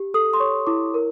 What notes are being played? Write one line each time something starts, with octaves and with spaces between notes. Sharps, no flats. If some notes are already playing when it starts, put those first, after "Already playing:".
Already playing: G4
A4 D#6
C6
C#5 C#6
E4 D6
A#4